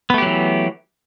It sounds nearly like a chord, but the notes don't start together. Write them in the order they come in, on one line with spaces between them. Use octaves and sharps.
B3 A3 G4 F#3 E3